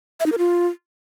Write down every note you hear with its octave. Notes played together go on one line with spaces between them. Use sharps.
E5
D#4
A#4
F4